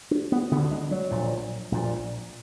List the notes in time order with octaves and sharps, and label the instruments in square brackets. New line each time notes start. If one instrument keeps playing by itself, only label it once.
[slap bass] D4
B3
D3 B3
D2
G#3
F#3
A#1 A#2
A#1 A#2